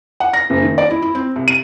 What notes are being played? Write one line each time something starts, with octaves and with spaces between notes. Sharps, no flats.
F#5
A#6
F#1
D#3
D5
E4
E4
C4
C2
D#7